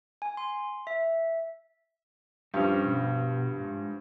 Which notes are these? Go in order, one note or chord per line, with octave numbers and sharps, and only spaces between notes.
G#5
C6
E5
G2 F3 G3 C#4
B2
G#2